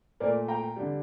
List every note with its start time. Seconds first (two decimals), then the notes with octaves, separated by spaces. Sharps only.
0.20 A#2 A3 A#4 D5
0.48 G5 A#5
0.76 D3 G3